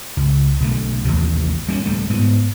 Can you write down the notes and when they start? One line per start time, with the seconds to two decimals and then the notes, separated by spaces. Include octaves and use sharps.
0.17 C#2
0.60 B1 D3 A3
1.05 A1 D#2 C3
1.68 G3 B3 C#4
1.86 D1 G3 A3
2.10 G#2 B3